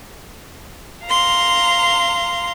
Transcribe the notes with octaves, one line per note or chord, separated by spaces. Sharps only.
F5 A#5 C6